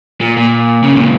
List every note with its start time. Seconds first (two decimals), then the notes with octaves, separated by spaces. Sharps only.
0.21 A#2
0.37 A#2
0.83 C#3
0.96 C#2 A#2